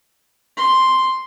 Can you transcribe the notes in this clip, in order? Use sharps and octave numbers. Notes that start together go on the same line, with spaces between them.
C6